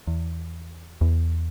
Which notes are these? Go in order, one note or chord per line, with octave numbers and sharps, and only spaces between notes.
E2
E2